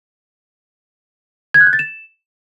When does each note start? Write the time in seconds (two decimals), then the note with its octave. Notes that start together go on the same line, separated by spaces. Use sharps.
1.54 G#6
1.61 F#6
1.67 G6
1.73 A6
1.79 E7